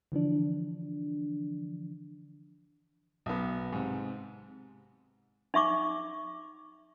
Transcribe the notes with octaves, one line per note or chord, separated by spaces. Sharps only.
D3 E3 F3 D4
B1 B3
G#2 C3
D#4 E5 C#6 D6